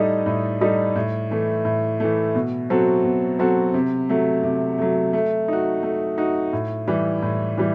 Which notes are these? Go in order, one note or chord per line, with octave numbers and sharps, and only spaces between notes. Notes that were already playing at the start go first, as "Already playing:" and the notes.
Already playing: A2 G3 D#4 A4 D#5
A2
G3 D#4 A4 D#5
A2
E3 A3
A2
E3 A3
B2
F#3 C4 F#4 A4
B2
F#3 C4 F#4 A4
C3
F#3 A3
C3
F#3 A3
A3
D#4 F#4
A3
D#4 F#4
A2
E3 G3
A2
E3 G3